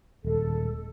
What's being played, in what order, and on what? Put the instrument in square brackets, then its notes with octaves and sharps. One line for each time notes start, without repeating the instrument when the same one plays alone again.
[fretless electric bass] D#1 G#3 [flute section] A4